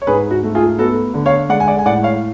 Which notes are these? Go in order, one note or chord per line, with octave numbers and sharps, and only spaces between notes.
C#5
G#2 G#4 B4
F#4
A3
F4 G#4
B3 F#4 A4
D3
C#5 F5
G#3 D5 F#5
G#5
D5 F#5
G#5
A2 D5 F#5
C#5 F5